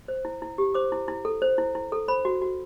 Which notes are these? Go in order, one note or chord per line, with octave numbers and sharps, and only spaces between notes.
C5
E4
E4
G4
C5 D6
E4
E4
A4
C5
E4
E4
A4
C5 B5
F#4
F#4